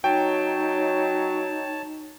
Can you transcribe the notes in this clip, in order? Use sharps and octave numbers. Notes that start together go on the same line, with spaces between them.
F#3 D#4 C#5 G5 A5